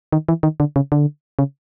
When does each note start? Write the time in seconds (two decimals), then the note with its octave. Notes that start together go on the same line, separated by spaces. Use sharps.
0.13 D#3
0.29 E3
0.43 D#3
0.60 D3
0.76 C#3
0.92 D3
1.39 C#3